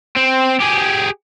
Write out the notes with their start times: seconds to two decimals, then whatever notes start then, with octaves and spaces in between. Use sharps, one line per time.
0.17 C4
0.61 G4 G#4